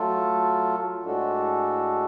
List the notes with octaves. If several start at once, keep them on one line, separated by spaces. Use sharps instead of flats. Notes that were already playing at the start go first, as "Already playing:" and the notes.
Already playing: F#3 A3 F4 A4
A2 G#3 D4 F#4 A4